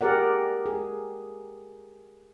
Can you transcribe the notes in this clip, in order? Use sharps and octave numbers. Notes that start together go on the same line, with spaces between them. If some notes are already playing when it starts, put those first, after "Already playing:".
G4 G#4 A#4 D5 F#5
G#4